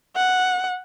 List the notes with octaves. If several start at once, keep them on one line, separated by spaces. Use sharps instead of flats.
F#5